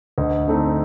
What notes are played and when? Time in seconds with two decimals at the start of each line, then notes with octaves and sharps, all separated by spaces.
0.18 D2 D#5
0.48 D3 A3 C4 D#4